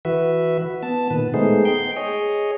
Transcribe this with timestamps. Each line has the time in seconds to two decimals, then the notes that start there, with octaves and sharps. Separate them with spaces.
0.05 E3 F#4 B4 E5
0.83 B3 A5
1.11 A#2 D#3 B4
1.34 G#3 A3 B3 D#4 G#4 C5
1.65 G5 C6
1.96 G#4 C#5 D#5